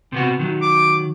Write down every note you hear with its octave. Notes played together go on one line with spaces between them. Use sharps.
C3 B3 F#4
D#3 F#3
D6